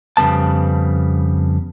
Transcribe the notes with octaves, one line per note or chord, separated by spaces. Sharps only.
F2 C#3 G3 B3 A5